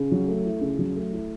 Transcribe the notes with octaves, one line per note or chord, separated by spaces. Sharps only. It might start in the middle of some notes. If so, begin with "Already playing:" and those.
Already playing: C#3
F#3
A3
E4
C#3
F#3
A3
E4